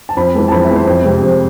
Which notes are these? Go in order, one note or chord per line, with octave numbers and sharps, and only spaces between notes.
A5
F2 B5
E3 G#3 B3
A5
F2 B5
E5
E3 G#3 B3
C5
F2
C3 G#3 C4
F2